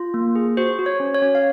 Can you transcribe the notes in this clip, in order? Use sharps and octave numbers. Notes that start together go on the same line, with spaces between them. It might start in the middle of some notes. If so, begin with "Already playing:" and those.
Already playing: F4
A#3
G#4
F#4 C5
F#4
C#5
C#4
C#5
C#4
F5